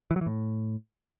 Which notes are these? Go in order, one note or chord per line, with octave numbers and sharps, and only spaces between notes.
E3
F#3
E3
A2